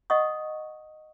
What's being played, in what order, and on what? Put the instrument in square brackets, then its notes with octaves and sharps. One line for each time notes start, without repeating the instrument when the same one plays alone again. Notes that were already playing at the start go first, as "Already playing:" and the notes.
[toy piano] D#5 F#5 C#6 D#6